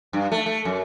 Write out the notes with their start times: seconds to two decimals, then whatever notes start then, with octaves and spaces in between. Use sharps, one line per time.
0.13 G2
0.32 A3
0.46 A3
0.65 F#2